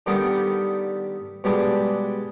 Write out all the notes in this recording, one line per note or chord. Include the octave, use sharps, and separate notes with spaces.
D3 D#3 G3 B3 D4 D#4
B2 G3 G#3 D4 B4